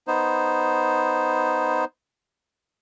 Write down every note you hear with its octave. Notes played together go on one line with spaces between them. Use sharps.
B3 D#4 C5